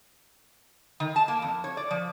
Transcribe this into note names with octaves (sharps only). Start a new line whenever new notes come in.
D#3
A5
A#3
F2
C#5
D5
F3